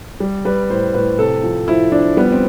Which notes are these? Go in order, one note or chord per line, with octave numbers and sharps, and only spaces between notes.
G3
G3 B4
A2 C5
A2 B4
C3 A4
F3
F3 E4
F3 D4
G3 B3
C4